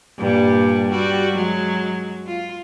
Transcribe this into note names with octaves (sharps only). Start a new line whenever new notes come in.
G2 A#2 G3
G3 F#4
F#3 G#3
F4